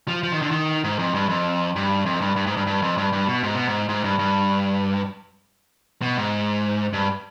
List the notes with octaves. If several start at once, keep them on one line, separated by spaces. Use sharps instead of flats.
F3
F3
D#3
D3
D#3
G#2
F2
G2
F2
G2
F2
G2
G2
G#2
G2
G2
F2
G2
G2
B2
G#2
B2
G#2
G#2
G2
G2
B2
G#2
G2